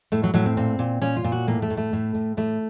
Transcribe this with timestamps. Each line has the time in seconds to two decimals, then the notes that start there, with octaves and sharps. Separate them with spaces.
0.12 A2 A3
0.24 F#3
0.34 A2 F#3
0.46 C4
0.57 A#2 C4
0.79 A#2
1.02 A#2 C#4
1.17 F4
1.24 A#2
1.32 F#4
1.47 A2 A#3
1.62 A3
1.70 A2
1.77 A3
1.93 A2
2.15 A2
2.37 A2 A3